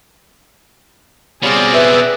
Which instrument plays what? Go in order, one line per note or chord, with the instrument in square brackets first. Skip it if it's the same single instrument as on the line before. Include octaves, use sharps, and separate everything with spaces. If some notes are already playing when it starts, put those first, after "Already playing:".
[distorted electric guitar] B2 C4 [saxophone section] G3 C#4 F4 [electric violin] G#4 D5
[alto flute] B4 [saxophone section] E5